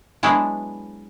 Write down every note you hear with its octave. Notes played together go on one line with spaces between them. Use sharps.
F#3 G#3 B3 D4 E4